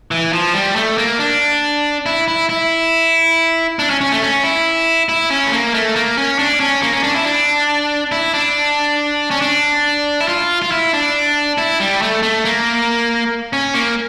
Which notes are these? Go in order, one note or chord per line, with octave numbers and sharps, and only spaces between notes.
E3
F3
G3
A3
A#3
D4
E4
E4
E4
D4
C#4
C#4
A3
C#4
E4
E4
C#4
A3
A#3
A3
A#3
C#4
D4
C#4
A#3
C#4
D4
E4
D4
E4
D4
C#4
D4
E4
F4
F4
E4
D4
E4
G3
A3
A3
A#3
C#4
A#3